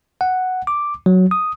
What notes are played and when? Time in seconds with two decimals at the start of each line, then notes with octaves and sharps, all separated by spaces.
0.21 F#5
0.67 D6
1.06 F#3
1.31 D#6